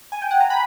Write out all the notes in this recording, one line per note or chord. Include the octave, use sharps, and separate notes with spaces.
G#5
G5
F#5
A#5
B5